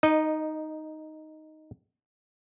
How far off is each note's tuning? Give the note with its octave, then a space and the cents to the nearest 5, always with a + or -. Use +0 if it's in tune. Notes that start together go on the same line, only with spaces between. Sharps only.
D#4 +0 D#5 -20